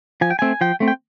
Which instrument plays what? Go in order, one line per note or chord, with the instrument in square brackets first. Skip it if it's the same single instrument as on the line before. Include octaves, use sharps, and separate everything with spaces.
[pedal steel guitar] F3 G#5
G5
A3 C4 G#5
F3 G5
A3 C4
G5